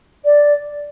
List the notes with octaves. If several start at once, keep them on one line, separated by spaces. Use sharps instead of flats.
D5